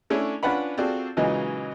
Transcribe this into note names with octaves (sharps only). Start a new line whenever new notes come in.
A3 C#4 D4 E4 C#5
C#4 D4 F4 B4 F#5 B5
C4 F4 F#4 G#4 A4 D5
A#2 C#3 E3 F#3 G#3 D#4